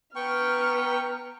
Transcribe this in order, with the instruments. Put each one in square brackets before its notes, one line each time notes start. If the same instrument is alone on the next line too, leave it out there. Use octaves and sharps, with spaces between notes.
[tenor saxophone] B3 [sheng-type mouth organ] G5 C#6 [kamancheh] A#5 F6